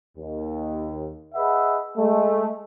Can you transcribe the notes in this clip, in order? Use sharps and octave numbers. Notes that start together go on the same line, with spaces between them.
D#2
G#4 B4 D#5 E5 F#5
G#3 A3